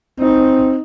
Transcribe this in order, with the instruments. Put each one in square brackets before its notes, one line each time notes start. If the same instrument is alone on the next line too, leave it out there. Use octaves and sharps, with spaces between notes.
[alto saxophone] C4 [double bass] D#4